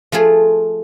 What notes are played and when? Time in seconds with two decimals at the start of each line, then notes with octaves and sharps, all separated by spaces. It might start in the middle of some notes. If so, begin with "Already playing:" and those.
0.12 F3 A3 F4 G#4